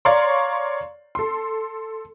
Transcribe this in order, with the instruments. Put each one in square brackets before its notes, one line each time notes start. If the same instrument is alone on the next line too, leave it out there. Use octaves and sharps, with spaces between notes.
[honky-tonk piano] C#5 D5 F5 A#5 C6 C#6
A4 C6